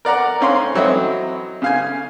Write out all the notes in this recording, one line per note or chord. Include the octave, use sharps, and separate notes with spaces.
A#4 D5 F#5 A#5
C4 C#4 F5 C6
E3 F#3 C4 E4 D#5
C#3 F5 G#5